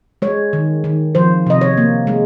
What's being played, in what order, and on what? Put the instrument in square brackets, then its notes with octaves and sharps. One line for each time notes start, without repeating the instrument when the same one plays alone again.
[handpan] G#3 C#5
D#3
D#3
F3 C5
C3 D#5
C#5
A#3
G#3